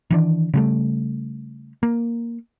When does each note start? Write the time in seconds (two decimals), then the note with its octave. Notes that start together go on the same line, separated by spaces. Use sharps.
0.10 D#3 E3 D4
0.54 C#3 G3 A3
1.83 A#3